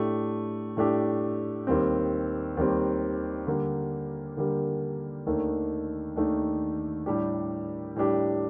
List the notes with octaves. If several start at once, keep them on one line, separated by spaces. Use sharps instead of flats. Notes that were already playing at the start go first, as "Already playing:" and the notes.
Already playing: A2 A3 D4 G4
A2 A3 D4 G4
D#2 D#3 G3 C4
D#2 D#3 G3 C4
D3 G3 A#3
D3 G3 A#3
D#2 D#3 A3 D4
D#2 D#3 A3 D4
A2 G3 D4 G4
A2 G3 D4 G4